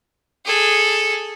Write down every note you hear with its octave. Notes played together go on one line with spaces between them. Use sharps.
G#4 A4